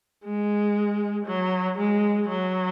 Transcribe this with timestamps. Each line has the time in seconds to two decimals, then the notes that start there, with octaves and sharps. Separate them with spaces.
0.24 G#3
1.26 F#3
1.78 G#3
2.29 F#3